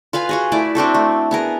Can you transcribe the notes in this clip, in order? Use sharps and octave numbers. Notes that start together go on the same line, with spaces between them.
F4 B4 F5 G#5
F4 F#4 G#4
A3 E4 D5
C4 D4 F#4 A4
A3
B3 G#4 A#4